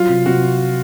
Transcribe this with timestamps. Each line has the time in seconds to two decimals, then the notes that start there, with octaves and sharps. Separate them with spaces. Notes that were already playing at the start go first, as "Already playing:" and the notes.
Already playing: F#3 F4
0.09 C3
0.26 C3 F#4